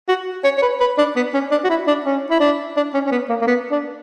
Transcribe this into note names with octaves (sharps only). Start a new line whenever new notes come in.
F#4
C#5
C#5
B4
B4
D4
B3
C#4
D4
F#4
E4
D4
C#4
E4
D4
D4
C#4
C#4
B3
A#3
A#3
B3
D4